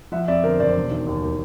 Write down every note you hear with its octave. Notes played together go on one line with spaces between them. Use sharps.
F3 E5 F#5
F2 D5 E5
D3 A#4 C5
F#1 C5 D5
E1
D#3
D#2
D#3